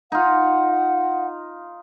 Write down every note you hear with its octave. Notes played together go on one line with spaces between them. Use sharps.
D#4 F4 F#5